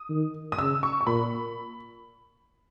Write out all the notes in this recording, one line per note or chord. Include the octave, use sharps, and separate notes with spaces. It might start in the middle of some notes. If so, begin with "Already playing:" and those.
Already playing: D#6
D#3
D#6
C#3 E6
C#6
C#6
A#2 B5